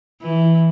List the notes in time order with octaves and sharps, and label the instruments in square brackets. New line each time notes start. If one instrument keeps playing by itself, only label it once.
[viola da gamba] E3